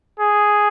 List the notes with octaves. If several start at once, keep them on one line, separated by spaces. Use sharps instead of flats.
G#4